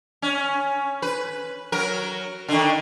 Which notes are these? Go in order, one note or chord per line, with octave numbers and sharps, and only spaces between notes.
C#4
B4
F#3 A#4
D3 D#3